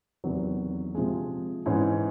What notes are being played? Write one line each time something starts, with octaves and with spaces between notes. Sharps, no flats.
E2 C3 D#3 F#3
C3 F3 G#3
G#2 E3 G#3 C#4